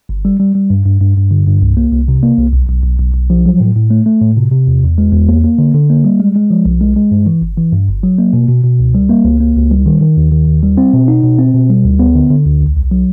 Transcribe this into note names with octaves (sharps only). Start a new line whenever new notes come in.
G1
G3
G3
G3
G2
G2
G2
G2
D3
G2
C2
A#3
C2
C3
A#3
C2
B1
B1
B1
B1
B1
F3
F#3
A2
A2
A3
A3
A2
C3
C3
E2
E2
G#3
E2
A#3
A#3
D3
D3
A#3
G3
G#3
G#3
F3
B1
G#3
G#3
G2
E3
G1
E3
G2
G1
F#3
A#3
B2
B2
B2
C#2
G3
A#3
C#2
A#3
C#2
G3
D#3
D#3
D#2
D#3
D#2
G3
C4
B2
D#4
B2
C4
B2
G3
D2
B3
D3
D3
D2
B1
B1
F#3